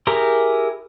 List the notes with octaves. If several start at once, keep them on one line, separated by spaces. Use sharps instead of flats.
E4 G4 G#4 A#4 A#5